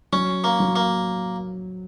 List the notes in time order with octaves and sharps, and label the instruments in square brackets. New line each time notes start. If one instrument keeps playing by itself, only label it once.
[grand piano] F#3 [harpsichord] C#4
[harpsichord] A#3
[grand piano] F#3
[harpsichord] A#3